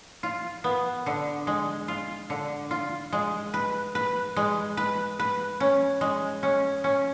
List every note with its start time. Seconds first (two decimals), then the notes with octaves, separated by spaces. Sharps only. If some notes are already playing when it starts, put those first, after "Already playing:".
0.23 F4
0.64 B3
1.06 D3
1.47 G#3
1.88 F4
2.30 D3
2.71 F4
3.13 G#3
3.54 B4
3.95 B4
4.36 G#3
4.77 B4
5.19 B4
5.60 C#4
6.01 G#3
6.43 C#4
6.84 C#4